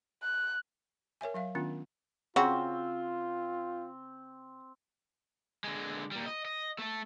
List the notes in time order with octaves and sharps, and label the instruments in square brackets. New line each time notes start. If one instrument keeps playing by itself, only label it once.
[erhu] F#6
[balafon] A#4 C#5 E5 G#5
F#3 E5 F5
D#3 B3 C#4 D4 F4
[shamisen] C#3 C#4 F#4 [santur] C4 [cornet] F4
[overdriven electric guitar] D3 G#3
A#2 G3
D#5
D#5
A3 A4